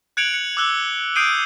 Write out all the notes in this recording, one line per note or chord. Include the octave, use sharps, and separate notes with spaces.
F#6 G#6 C#7 D7 F7 F#7
C#7
D6 E6 F#6 G7
D#6 G6 C7 D7 D#7 G7